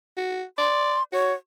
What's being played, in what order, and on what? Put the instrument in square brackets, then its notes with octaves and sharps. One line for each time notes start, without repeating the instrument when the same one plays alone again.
[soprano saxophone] F#4
[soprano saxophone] D5 [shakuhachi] C6
[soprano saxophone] F#4 [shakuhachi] C#5